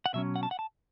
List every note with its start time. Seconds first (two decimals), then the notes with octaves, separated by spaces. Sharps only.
0.06 F#5
0.14 B2 F#3 C#4 E5
0.36 F#5
0.43 A5
0.51 F#5
0.59 A5